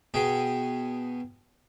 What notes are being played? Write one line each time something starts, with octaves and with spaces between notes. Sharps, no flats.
B2 G#4 G5